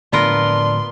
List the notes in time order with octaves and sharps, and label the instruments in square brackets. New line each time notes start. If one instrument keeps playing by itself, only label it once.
[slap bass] A2 D3 F3 [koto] B3 F4 A#4 [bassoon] D4 [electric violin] C6